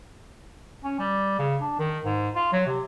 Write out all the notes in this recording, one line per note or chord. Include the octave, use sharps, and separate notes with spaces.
C#4
G3
C#3
D4
D#3
G#2
F4
F#3
C3